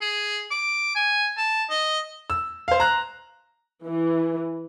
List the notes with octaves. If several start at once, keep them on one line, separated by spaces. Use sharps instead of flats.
G#4
D6
G#5
A5
D#5
E6
C5 F5
A#5 F#6
E3